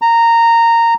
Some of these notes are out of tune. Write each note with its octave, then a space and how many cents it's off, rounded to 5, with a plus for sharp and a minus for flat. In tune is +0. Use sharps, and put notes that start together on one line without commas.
A#5 -15